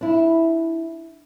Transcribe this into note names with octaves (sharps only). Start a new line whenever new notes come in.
D4 E4